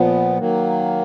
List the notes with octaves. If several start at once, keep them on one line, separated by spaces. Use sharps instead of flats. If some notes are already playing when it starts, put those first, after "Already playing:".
Already playing: A#2 F3 B3
D#3 F#3 A#3